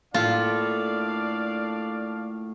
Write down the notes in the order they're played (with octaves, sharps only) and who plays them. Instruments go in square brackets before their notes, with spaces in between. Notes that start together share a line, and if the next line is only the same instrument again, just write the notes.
[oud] A2 [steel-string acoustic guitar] A#3 E4 A4 [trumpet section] D4 D5 F5 [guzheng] F4